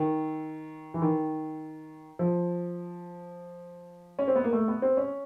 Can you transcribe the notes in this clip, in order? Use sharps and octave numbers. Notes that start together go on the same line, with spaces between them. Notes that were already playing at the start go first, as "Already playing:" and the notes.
Already playing: D#3
E3
D#3
F3
C#4
C4
B3
A#3
A3
B3
C4
C#4